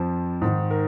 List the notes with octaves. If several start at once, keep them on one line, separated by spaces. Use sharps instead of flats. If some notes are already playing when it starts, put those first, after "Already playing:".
Already playing: F2 F3
G#2 D#3
A#4